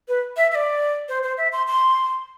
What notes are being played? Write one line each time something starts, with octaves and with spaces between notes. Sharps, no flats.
B4
E5
E5
D5
C5
C5
E5
C6
C6